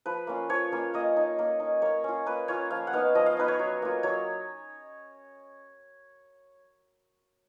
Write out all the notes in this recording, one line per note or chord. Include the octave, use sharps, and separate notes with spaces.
F3 B4
A#3 C#4 F4
F3 C#5
A#3 C#4 F4
A#3 D#5
D#4
A#3
D#4
A#3 C#5
C#4 F4
A#3 B4
C#4 F4 C#5
F3 F5
F#5
B3 D#4 F5
F3 D#5
F5
B3 D#4 B4
C#5
F#3
A#3 F4
F#3 C#5